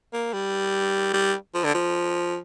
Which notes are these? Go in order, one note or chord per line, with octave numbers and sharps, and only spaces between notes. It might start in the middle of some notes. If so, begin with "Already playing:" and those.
A#3
G3
G3
F3
D3
F3